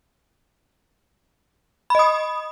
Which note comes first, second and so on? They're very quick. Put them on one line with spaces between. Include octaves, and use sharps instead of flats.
B5 D#5 D#6